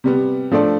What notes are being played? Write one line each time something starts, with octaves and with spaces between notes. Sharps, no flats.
C3 G3 B3
F3 A3 D4 A4 D5